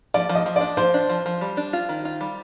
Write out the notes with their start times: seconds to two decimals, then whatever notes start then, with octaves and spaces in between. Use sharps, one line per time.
0.14 F3 D5
0.29 F3
0.35 D#5
0.46 F3
0.56 D5
0.61 D4
0.77 F3 C5
0.94 D4
1.09 F3
1.26 F3
1.41 G3
1.57 D4
1.73 F4
1.89 D#3
2.05 F4
2.21 G3